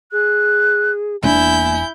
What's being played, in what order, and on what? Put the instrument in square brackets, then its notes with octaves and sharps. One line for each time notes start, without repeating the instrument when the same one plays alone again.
[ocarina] G#4 [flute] F#6
[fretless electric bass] E1 C4 D4 [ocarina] A#3 [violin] E4 G6 [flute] G#5